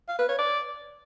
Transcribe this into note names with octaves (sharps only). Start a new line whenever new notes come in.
F5
B4
C#5
D5